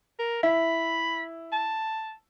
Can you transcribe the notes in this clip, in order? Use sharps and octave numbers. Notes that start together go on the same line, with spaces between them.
A#4
E4 B5
A5